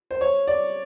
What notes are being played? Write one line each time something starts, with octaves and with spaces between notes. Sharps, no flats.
C5
C#5
D5